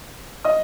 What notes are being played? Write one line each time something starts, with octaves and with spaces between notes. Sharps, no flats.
D#5 D#6